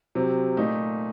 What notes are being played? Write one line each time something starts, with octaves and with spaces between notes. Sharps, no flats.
C3 F#3 C4
A#2 A3 D#4